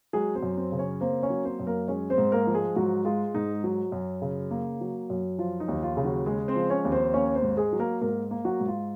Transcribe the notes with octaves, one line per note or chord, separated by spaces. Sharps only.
F#3 G#3 G#4
C4 C5
F#2
C4 C5
C#3
C#4 C#5
A#3 C4 C5
C#4 C#5
F#3
C4 C5
F#2
A#3 A#4
G#3 C#4 C#5
C4 C5
G#2
A#3 A#4
F3
G#3 G#4
G#2 F#3 F#4
G#3 F4
G#2 D#4
F#3
F#2
C#3
A#3
F#3
F#2
F3 F4
D#4
D#2
F4
C#3
F#3 F#4
G#3 G#4
C4 C5
F3
C#4 C#5
D#2
C4 C5
A#3 C#4 C#5
C4 C5
G#2
G#3 G#4
F#3
A#3 A#4
G#2 A#3 A#4
A#3
F#3 F#4
G#2
F4